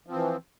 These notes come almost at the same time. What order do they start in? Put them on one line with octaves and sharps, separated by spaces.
F3 C4 E3